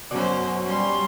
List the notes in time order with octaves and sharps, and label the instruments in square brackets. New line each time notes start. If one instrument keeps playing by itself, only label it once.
[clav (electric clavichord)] F#2 D5 [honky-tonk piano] B2 F#3 [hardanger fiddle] C#4 C5
[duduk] G3 [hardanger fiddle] C#4 C6